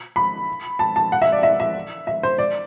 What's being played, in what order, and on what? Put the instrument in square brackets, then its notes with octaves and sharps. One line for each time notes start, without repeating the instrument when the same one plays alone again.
[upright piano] B5
A5
A5
F#5
E5
D5
E5
E5
E5
C5
D5